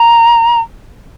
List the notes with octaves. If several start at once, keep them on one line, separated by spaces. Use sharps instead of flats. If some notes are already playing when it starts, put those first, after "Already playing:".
Already playing: A#5